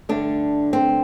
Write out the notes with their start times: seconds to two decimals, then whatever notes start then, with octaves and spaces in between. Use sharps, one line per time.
0.09 G2 D3 A3 D4
0.73 C4